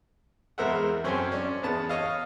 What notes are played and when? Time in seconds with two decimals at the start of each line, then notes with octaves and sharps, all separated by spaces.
0.58 E2 G#3 A#4 C5 E5 F#5
1.04 F#2 C4 C#4 A4 G#5 C6
1.32 C#4 D4
1.63 E2 B3 A5
1.89 C#5 D#5 F5